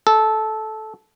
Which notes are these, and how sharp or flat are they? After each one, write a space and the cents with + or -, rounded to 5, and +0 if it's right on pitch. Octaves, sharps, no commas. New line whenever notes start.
A4 -15